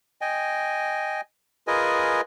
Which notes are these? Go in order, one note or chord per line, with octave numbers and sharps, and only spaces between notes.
D#5 G5 G#5
F4 G#4 A#4 B4 D#5 G#5